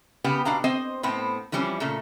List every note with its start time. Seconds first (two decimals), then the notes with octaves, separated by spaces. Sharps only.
0.24 C#3 B3 G4
0.45 B2 D4 F5 A#5
0.64 C4 C5 D#5
1.03 A2 B3 C4
1.52 E3 F3 G3 C4 C#4
1.80 A#2 C#3 A3